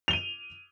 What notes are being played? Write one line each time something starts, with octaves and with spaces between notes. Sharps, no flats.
D#7 F7 G7